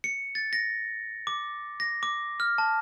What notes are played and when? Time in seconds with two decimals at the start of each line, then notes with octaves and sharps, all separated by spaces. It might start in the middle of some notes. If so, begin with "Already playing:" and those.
0.04 C#7
0.35 A6
0.53 A#6
1.27 D6
1.80 A#6
2.03 D6
2.40 F6
2.58 A5